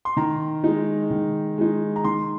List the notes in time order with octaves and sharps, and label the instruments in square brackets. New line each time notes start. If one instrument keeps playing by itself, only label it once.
[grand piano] C6
D#3 A#5
G#3 D#4
D#3
G#3 D#4
A#5
D#3 C6